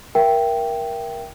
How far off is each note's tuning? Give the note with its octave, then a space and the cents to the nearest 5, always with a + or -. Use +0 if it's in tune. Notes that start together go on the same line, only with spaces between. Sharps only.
A#4 +15 E5 +30 G5 +0